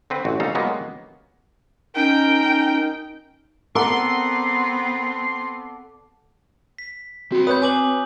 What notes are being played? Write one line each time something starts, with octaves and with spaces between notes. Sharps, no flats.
D3 C4 B4
A1 F#4
C2 A#2 C#3 D#4 A4 F5
F#3 G#3 A#3 B3 G4
C#4 D#4 A#4 G5
B3 C4 A4 A#4 D5 F#5 C6
B6
C4 F#4 B5
B4 C#5 D#6 G6
G#5 D6 F#7